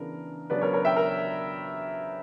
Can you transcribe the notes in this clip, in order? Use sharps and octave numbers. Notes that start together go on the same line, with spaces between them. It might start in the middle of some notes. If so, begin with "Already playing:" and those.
Already playing: C#3 E3 B3 D4 A#4
C#3 F#3 B3 D4 B4 D5
A#4 C#5
A#4 C#5
E5 G5
A#4